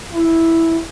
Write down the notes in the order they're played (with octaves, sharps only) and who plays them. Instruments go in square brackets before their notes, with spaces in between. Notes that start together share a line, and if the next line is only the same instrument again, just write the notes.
[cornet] E4